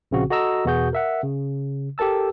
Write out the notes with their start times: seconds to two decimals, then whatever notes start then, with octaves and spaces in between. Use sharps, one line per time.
0.11 A#1 C#3 C4 F#4
0.30 F#4 A4 D#5 A#5 E6
0.65 E2 B2 B3 F#4 G#4 G6
0.93 A#4 E5 F#5
1.23 C#3
1.98 G4 A4 A#4 A5 E6